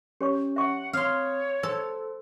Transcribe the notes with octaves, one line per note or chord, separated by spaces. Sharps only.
C#4 G4 C#5 C#6
E5 F#5 C#6
C4 C#5 F5 C6 D#6 F6
A4 C5 C6